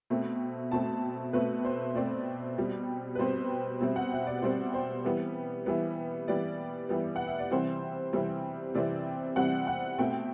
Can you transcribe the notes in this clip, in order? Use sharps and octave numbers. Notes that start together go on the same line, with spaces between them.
B2 A3 C4
B2 A3 C4 A5
B2 A3 C4 B4
C5
B2 A3 C4 D5
B2 G3 C4
B4
B2 G3 C4 C5
B2 G3 C4 E5
F#5
E5
D5
B2 G3 C4 C5
C5
E3 G3 B3
E3 G3 B3
E3 G3 B3 D5
E3 G3 B3
F#5
E5
D5
C3 E3 G3 C4 C5
C3 E3 G3 C4
C3 E3 G3 C4 D5
C3 E3 G3 C4 F#5
F#5
B2 A3 C4 G5